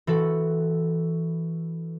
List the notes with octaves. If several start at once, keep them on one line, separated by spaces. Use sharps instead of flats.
E3 F#4 A4